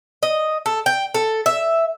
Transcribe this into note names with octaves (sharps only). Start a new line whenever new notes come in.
D#5
A4
G5
A4
E5